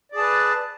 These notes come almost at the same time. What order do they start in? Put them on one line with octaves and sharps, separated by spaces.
D5 G#4 A5 B4